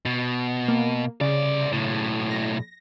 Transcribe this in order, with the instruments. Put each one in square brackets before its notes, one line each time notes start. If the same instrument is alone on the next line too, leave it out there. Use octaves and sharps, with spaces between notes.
[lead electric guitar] B2
[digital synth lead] A#3
[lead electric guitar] C2 D5 [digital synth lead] C#3
[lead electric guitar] B1 A2
[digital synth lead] A#6